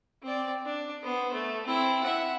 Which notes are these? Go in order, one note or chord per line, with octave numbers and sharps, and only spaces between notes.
C4 D5
D4
B3 C5
A3
C4 E4
E5 F#5